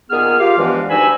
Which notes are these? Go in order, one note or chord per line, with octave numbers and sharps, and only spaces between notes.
A#2 D#3 B3 G#4 F6
F4 G4 F5
E2 G2 E3 F3 G#3 B3
D2 G2 D#4 G#5 B5 E6